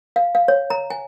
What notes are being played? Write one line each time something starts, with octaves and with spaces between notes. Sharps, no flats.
F5
F5
C#5
A#5
G#5